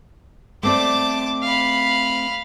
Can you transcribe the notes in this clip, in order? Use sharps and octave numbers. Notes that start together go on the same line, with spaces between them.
A3 C4 D5 A5 D6
F5 B5